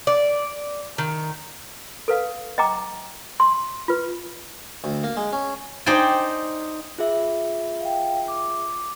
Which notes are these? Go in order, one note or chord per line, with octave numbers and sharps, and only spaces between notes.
D5
D#3
A4 B4 F5
D#5 F#5 G5 A#5 D6
C6
F4 B4
D2
A#3
G#3
C#4
D#4 C5 D5 G5 G#5
F4 G#4 E5
F5 G5
D6